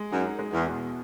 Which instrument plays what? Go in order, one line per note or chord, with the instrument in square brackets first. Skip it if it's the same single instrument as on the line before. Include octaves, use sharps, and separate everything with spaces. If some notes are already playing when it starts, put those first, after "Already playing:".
Already playing: [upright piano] G#3
[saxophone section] F#2 [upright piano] D#4
[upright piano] G#3
[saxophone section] E2
[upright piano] B2